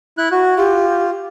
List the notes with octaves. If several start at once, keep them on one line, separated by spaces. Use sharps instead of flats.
E4 F#6
F#4
F4 G4